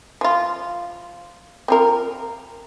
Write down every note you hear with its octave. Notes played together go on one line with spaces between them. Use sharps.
F3 F4
C4 F4 A#4